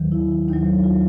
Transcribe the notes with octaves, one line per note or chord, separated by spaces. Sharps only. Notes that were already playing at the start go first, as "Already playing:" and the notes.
Already playing: D#2 D#3 F#3
E4
D#2 D#3 F#3 D#4
F4